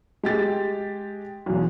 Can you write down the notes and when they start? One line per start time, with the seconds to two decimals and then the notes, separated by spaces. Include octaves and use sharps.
0.23 G#3 G4 A6
1.46 B1 E2